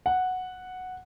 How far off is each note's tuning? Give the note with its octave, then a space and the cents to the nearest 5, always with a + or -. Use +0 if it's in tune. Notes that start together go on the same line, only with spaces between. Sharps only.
F#5 -5